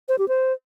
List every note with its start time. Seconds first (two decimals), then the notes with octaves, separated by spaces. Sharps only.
0.09 C5
0.18 G4
0.28 C5